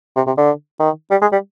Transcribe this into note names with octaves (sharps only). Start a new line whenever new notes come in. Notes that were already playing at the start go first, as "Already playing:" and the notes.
C3
C3
D3
D#3
G3
G#3
G3